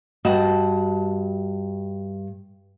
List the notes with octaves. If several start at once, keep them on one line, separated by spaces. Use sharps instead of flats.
G2 F#4 D#5 A5